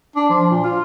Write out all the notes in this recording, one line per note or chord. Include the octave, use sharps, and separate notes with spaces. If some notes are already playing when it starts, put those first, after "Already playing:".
D4
F3
A#2
F4